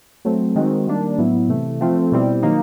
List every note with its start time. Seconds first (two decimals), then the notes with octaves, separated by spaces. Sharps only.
0.25 F#3 A3 C4
0.55 D#3 G#3 C4 D#4 F#4
0.87 D#3 G3 A#3 D4
1.18 A2 F#3 B3 E4
1.49 C3 E3 A3
1.81 F3 A3 C4 F4
2.12 B2 G3 C4 E4
2.42 D#3 F#3 A#3 D#4